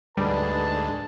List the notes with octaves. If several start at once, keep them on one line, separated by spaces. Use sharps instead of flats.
D2 G#2 G3 B4 A5